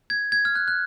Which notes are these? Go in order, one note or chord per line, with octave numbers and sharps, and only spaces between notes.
G#6
G#6
F6
F#6
F#6